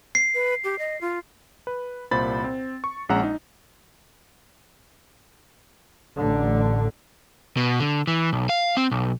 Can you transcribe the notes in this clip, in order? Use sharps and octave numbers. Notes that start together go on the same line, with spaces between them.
C7
B4
G4
D#5
F4
B4
C2 A#2 C5 B5 A6
C4
C#6
A#1 G#3 C#4 F#5 A#5 E6
D#4
A1 D3
B2
D3
E3
B1
F5
C4
B1